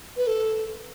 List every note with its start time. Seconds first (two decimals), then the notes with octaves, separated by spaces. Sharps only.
0.17 B4
0.27 A4